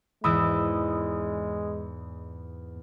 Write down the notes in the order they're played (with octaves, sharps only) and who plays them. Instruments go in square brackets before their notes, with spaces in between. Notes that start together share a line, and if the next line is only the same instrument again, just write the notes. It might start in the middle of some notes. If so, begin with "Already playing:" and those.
[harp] E2 G#2 E3 [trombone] G#3 [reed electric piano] B5 D#6 E6